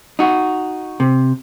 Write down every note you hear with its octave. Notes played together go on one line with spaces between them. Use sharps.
D#4 F#4
C3